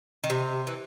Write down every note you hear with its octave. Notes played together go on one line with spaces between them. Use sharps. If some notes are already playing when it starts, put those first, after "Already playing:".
D#3
C3
E3